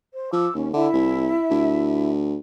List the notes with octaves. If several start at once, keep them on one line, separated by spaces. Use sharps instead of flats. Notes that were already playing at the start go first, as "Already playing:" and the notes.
C5
F3 D6 E6
D#2 C#4
D3 E4 E5
C2
D2